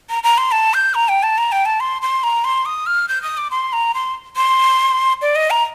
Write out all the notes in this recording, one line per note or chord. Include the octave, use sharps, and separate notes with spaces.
A#5
A#5
C6
A5
G6
A#5
G5
A5
A#5
G5
A5
C6
C6
A#5
C6
D#6
F6
G6
D#6
D6
C6
A#5
C6
C6
D5
D#5
A#5